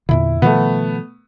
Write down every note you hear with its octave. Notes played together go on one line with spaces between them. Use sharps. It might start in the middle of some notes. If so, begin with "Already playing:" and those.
E2 A#2 D3 E4
B2 D#3 F3 A3 B3